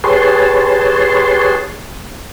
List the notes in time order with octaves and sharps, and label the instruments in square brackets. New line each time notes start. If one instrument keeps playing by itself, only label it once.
[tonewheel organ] G4 G#4 B4 C#5 A5 C6